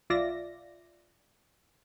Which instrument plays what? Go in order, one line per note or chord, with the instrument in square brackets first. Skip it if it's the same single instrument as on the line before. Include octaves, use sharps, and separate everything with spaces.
[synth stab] B1 F4 D5 E5 A#6